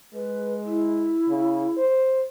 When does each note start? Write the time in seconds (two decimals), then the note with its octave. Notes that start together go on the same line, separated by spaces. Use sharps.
0.14 G#3 B4
0.65 E4
1.29 C#3
1.77 C5